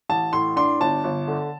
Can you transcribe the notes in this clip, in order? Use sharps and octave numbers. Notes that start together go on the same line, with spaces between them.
A1 A5
A2 C6
D4 C6
G1 A5
G1
D3